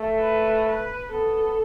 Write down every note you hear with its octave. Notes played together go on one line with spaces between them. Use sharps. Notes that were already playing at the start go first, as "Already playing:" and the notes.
Already playing: A3
B4
B4
B3 A4